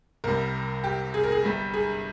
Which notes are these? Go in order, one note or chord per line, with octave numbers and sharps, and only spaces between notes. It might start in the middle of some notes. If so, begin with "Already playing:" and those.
C2 C3 G3 A#4
G4
G#4
A#4
G#4
G1 G2 G3
G#4